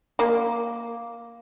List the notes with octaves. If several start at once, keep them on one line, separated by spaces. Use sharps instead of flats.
A#3